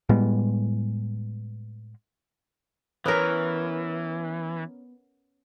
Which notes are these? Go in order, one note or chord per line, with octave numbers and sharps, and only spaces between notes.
A2 G3 G#3 B3
E3 B3 C#4 A#4